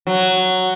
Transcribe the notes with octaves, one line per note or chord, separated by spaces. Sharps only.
F#3